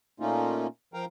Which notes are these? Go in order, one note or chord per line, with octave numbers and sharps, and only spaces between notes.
A#2 A3 A#3 C#4 D#4 F4
F3 A#4 F5 G5 A#5